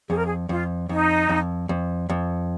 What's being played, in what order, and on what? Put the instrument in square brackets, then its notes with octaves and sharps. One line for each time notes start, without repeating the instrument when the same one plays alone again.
[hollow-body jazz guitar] F2 [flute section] G#4
[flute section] A#4
G#4
[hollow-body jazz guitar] F2 [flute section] F4
[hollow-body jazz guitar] F2 [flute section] D#4
[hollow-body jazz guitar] F2
F2
F2